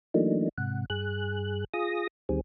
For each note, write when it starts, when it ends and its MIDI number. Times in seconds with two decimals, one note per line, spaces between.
0.14 0.49 52
0.14 0.49 54
0.14 0.49 57
0.14 0.49 58
0.14 0.49 62
0.14 0.49 63
0.58 0.85 44
0.58 0.85 48
0.58 0.85 78
0.90 1.64 43
0.90 1.64 68
0.90 1.64 90
1.74 2.07 65
1.74 2.07 68
1.74 2.07 87
1.74 2.07 94
2.29 2.41 38
2.29 2.41 51
2.29 2.41 55
2.29 2.41 60
2.29 2.41 68